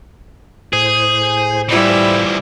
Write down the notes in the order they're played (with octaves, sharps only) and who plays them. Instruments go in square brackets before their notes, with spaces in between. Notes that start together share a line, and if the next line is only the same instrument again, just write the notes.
[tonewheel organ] A2 C5 [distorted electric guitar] G#4
[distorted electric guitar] E3 F3 [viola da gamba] G3 E4